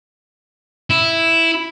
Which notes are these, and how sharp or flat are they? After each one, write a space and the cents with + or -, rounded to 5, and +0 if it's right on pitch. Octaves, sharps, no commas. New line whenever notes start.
E4 +0